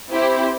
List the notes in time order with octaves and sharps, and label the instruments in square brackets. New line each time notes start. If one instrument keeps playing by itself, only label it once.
[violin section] C4 E4 G4 C5